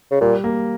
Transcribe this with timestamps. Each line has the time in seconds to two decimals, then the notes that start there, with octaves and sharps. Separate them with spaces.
0.11 C#3
0.21 A#2 G3
0.44 A#3